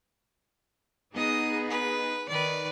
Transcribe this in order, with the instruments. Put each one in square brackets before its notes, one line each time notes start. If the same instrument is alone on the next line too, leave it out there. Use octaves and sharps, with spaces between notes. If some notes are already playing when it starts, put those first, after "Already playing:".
[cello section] B3 D#4 G#4 [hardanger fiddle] D#5 D#6
[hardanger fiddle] B4
[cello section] D#3 [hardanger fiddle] B4 D5